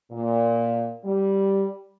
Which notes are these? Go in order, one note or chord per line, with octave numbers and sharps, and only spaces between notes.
A#2
G3